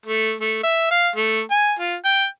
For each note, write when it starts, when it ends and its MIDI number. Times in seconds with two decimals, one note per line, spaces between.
0.06 0.34 57
0.41 0.61 57
0.63 0.88 76
0.91 1.10 77
1.16 1.41 57
1.51 1.74 80
1.79 1.96 65
2.05 2.26 79